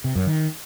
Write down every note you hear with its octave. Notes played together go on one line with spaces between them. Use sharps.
C3
F#2
D#3